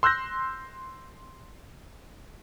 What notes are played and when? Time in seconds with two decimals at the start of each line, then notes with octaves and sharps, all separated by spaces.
0.03 C6 E6 F#6 G6 A#6